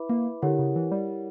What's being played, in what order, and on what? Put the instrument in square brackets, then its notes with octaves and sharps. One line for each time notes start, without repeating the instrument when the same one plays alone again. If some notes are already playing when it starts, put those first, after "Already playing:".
Already playing: [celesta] E4 B4 E5 B5 D6
[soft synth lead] A#3
[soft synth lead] D3 [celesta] E4 G4 A#4 C#5 F#5
[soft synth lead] C#3
E3
G3